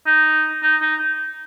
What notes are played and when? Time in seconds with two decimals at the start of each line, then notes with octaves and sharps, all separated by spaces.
0.07 D#4
0.63 D#4
0.82 D#4